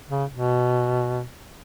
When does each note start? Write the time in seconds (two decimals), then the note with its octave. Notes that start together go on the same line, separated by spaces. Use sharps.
0.09 C#3
0.31 B2